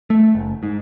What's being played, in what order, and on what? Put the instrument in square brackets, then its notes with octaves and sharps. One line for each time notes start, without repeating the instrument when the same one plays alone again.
[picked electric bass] A3
F#1
G#2